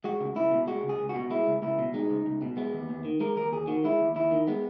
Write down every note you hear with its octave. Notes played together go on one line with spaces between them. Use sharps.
G#3 F#4
C#2
C#2 E4
B2
G#3 F#4
C#2
G#4
C#2
F#4
B2
G#3 E4
C#2
C#2 E4
B2
G#3 D#4
C#2
C#2
B2
G#3 B3
D#2
D#2
D#3
G#3 A#4
D#2 A#4
D#2 G#4
D#3 F#4
G#3 E4
D#2
D#2 E4
D#3
G#3 B3